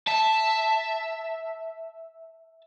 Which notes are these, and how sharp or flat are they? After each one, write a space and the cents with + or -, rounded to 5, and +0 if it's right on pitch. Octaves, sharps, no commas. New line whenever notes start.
E5 +0 A5 +0